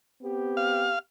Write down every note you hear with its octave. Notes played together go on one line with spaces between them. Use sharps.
B3 C4 G4
F5